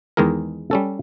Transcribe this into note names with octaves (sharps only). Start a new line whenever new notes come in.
E2 D#3 G#3 G#4 A#4
G3 C#4 A4